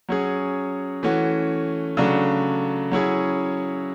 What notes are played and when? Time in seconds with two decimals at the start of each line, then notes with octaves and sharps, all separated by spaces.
0.09 F#3 C#4 G#4
1.03 E3 A3 C#4 F#4
1.97 C#3 F#3 A3 D4
2.91 F#3 C#4 E4 G#4